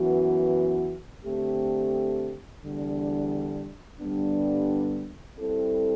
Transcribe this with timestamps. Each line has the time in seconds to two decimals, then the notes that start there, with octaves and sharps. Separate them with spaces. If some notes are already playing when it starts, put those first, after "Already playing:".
Already playing: F#2 E3 B3 F#4
1.24 D3 A3 C4 G4
2.63 E2 D3 G3 D4
4.01 G2 D3 G3 B3 D4
5.39 G3 C4 E4 A4